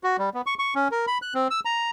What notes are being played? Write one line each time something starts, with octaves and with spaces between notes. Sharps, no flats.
F#4
G3
B3
C#6
C#6
C#4
A#4
B5
F#6
C4
E6
A#5